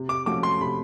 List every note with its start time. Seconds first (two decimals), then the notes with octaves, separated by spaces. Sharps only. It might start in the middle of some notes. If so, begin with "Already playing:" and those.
Already playing: C3
0.09 D6
0.26 F3 A3 C#4 F#4 D6
0.43 C6
0.61 C3 B5